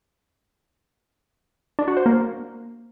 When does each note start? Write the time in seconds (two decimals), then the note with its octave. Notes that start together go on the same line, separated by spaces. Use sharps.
1.79 D4
1.88 F#4
1.97 C5
2.06 A#3